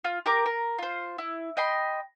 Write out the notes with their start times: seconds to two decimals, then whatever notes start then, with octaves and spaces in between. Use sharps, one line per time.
0.04 F4
0.26 G4 A#4 D6
0.46 A#4
0.78 F4 C5
1.18 E4
1.57 D#5 G5 B5 C6